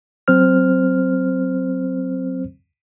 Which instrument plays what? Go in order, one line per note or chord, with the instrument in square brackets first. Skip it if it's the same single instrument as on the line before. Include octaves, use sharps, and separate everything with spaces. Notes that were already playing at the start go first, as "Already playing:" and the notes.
[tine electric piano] F#3 C4 C5 F6